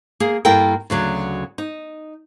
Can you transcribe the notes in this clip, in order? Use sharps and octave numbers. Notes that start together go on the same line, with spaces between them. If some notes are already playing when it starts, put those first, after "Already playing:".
A#3 G#4
G2 A#3 E4 A4 A#4 G5
D2 C#3 F#3 D4
D#4